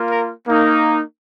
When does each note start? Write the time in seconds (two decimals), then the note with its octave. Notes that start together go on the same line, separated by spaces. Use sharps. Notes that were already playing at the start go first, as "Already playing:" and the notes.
Already playing: A#3 F4
0.11 A#4
0.46 A#3 D#4